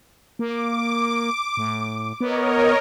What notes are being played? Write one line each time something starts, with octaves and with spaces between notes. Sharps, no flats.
A#3 D6
A2
B3 A#4 C#5 D#5